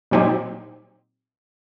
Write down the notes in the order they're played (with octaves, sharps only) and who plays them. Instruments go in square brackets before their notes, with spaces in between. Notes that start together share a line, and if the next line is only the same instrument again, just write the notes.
[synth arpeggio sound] A#2 F#3 C4 D#4 G4